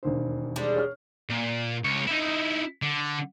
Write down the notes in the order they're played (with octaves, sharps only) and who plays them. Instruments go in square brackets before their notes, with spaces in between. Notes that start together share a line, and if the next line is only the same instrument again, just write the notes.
[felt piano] E1 D#2 C5
[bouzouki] G3 G#3 D4
[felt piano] C#5 F6
[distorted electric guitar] A#2
C#2 C#5
D#4 E4
D3